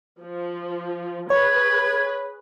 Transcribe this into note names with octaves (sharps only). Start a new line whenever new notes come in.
F3
G#4 B4 C#5 G#6